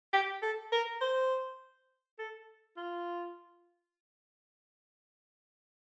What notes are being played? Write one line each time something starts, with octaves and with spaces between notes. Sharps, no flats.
G4
A4
A#4
C5
A4
F4